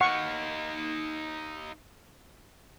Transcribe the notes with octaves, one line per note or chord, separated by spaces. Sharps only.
D#4 F5 F#5 C#6